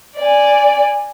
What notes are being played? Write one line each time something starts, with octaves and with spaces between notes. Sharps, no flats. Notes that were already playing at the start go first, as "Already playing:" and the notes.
D5 G#5